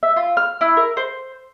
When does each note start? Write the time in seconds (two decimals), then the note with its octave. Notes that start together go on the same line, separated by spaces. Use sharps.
0.03 E5
0.16 F4
0.37 F6
0.61 E4
0.77 A#4
0.97 C5